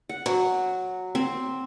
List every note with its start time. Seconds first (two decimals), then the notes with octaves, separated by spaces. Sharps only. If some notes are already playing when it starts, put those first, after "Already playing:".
0.09 F#5
0.26 F#3
1.15 C4